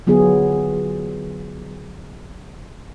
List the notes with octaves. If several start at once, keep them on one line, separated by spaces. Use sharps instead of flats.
D3 F#3 B3 F4 G#4